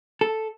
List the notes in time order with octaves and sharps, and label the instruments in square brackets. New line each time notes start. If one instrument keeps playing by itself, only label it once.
[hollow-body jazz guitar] A4